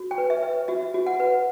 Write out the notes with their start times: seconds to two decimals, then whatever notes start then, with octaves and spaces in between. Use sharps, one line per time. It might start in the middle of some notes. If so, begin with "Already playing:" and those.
Already playing: F#4
0.11 G5
0.18 B4
0.30 E5
0.43 B4
0.68 F#4 E5
0.94 F#4
1.07 F#5
1.20 B4